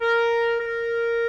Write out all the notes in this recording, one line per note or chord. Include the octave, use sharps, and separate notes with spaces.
A#4
A#4